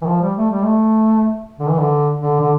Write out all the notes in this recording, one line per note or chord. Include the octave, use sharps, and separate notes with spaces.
E3
F3
G3
A3
G3
A3
D3
E3
D3
D3
D3